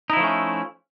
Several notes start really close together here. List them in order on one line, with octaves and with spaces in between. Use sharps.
D#4 E4 F3 A3 C#4